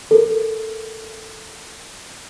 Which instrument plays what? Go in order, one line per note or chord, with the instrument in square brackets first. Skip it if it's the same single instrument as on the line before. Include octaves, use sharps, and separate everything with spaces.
[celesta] A4 A#4